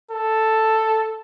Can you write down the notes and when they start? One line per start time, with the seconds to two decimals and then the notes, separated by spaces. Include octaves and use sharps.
0.11 A4